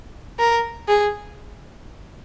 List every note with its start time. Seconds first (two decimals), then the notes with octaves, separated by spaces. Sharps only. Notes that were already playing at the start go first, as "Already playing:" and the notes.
0.39 A#4
0.88 G#4